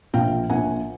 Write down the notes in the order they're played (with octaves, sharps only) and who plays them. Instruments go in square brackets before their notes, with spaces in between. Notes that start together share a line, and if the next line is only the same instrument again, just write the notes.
[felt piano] A#1 A#2 F3 F5 G5
A#1 A#2 F3 F#5 G#5